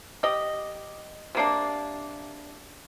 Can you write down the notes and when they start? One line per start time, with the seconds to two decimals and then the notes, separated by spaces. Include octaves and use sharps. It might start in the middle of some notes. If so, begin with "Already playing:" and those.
0.23 G4 D#5
1.35 C3 A#3 D4